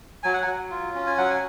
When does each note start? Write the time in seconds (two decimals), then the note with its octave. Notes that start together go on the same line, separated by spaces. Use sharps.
0.23 F#3 G#5
0.34 F#5
0.42 F#3 G#5
0.71 F4
0.95 C#4
1.06 G#5
1.18 F#3 F#5
1.30 G#5